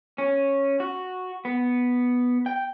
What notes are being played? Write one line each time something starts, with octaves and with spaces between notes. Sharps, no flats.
C#4
F#4
B3
G5